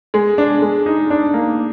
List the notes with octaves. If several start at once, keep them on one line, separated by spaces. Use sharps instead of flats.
G#3
D4
G#3
D#4
D4
A#3